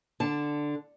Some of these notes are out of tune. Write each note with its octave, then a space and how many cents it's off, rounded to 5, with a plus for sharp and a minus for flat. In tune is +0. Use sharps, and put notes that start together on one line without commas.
D3 +5 A5 +0